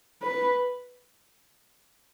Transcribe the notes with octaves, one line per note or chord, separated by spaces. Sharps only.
B4